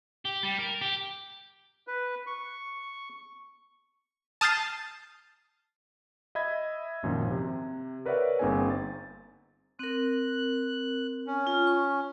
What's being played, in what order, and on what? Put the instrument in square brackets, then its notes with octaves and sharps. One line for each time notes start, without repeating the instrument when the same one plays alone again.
[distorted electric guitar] G4
G3
A#4
G4
[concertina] B4
C#6
[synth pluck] A5 D#6 F6 G6 A6 C7
[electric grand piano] D#5 E5 B5 G#6
G#1 F#2 A#2 D#3 F3
C3
A#4 B4 C#5 D5 E5 F#5
G1 A#3 C4 D#4 G#4 G#5
A6
[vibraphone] C4 A#4 [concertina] F#6
[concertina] C#4
[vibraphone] F4
C#6